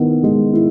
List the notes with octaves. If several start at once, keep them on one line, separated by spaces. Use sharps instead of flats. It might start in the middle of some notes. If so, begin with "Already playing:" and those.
Already playing: D#3 B3 E4
G#3
E4